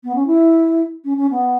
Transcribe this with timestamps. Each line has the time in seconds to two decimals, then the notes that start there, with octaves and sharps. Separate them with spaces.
0.04 B3
0.15 C#4
0.27 E4
1.04 C#4
1.17 C#4
1.31 B3